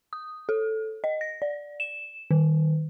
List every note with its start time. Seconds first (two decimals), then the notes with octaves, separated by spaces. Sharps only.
0.13 D#6
0.49 A4
1.04 D#5
1.21 A#6
1.42 D5
1.80 E7
2.31 D#3